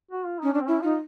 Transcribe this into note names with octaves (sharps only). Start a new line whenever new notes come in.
F#4
F4
C#4 D#4
C#4 D4
C4
C#4 E4
D#4 F4